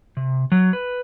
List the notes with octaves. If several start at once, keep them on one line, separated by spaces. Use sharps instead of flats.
C3
F#3
B4